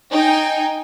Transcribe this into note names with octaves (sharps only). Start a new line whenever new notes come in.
D#4 G5 G#5